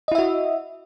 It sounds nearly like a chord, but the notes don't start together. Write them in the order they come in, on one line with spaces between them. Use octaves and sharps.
D#5 E4 E5 F#4